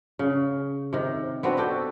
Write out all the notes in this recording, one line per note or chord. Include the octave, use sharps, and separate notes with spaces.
C#3
C3 D#3
B3 C4 D4 F#4
F#4 G4 A4 G5